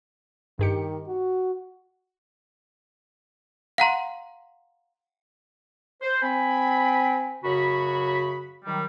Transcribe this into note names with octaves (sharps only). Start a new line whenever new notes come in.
G2 D#3 G4 C#7
F#4
F5 F#5 A#5 C6
C5
C4 G#5 B5
F#2 C#3 F#4 C#5 B5
D#3 F#3 G3